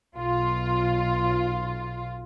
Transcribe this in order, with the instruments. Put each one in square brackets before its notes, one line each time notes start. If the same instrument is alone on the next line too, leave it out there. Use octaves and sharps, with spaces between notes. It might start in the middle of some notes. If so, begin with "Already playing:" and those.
[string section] B1 F4